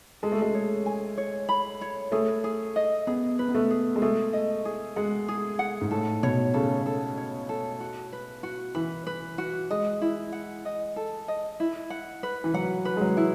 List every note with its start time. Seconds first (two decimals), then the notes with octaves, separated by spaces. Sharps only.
0.23 G#3 A4
0.32 A3
0.42 G#3
0.54 C#5
0.86 G#5
1.17 C#5
1.49 B5
1.81 C#5
2.12 A3 G#4
2.44 G#4
2.76 D#5
3.07 B3 G#4
3.39 B4
3.48 B3
3.55 A3
3.71 G#4
3.96 G#3
4.02 A3 G#4
4.33 D#5
4.65 G#4
4.96 G#3 F#5
5.28 G#4
5.59 F#5
5.81 G#2
5.91 A2 A4
6.23 B2 C#5
6.54 C#3 A4
6.86 A4
7.17 C#5
7.49 A4
7.80 F#4
8.12 B4
8.43 F#4
8.75 E3 B4
9.06 B4
9.38 F#4
9.71 G#3 D#5
10.01 E4
10.32 F#5
10.65 D#5
10.96 A4
11.28 D#5
11.60 E4
11.90 F#5
12.23 B4
12.44 E3
12.54 F#3 F#5
12.85 B4
12.97 G#3
13.01 F#3
13.17 E4